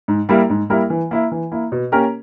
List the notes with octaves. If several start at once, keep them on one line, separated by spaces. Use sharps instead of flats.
G#2
G3 A#3 E4 A#4
G#2
G3 A#3 E4 A#4
E3
A#3 E4
E3
A#3 E4
B2
A#3 C#4 G4 A#4